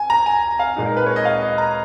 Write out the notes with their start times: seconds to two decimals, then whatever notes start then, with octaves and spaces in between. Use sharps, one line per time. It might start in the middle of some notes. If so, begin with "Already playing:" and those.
Already playing: G#5
0.10 A#5
0.26 G#5
0.59 F5
0.76 A#2 G#3 D#4
0.86 A#4
0.97 B4
1.06 C#5
1.16 D#5
1.25 F5
1.42 D#5
1.58 A#5